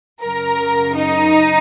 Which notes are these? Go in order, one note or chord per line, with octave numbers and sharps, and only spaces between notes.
F#2 C#3 F#3 A#4
D#4